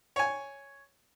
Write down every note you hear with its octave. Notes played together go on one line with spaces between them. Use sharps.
C#5 G#5